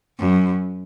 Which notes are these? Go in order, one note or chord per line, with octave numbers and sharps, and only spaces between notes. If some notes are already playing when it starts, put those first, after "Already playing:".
F#2